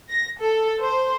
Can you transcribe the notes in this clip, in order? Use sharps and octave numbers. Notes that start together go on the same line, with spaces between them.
A#6
A4
C5